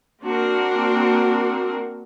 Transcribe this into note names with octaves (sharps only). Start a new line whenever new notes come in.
A#3 C4 D4 F#4 A#4